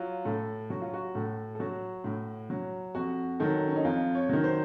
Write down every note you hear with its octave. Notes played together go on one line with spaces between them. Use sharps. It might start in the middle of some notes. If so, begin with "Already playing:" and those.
Already playing: F#3 F4
A2 A4
F#3 F#4
F4
F#4
A2 A4
A4
F#3 F#4
A2
F#3
F2 F#4
D#3 F#3 A4
C#4
D#4
F2 F4
C#5
D#3 F#3
C5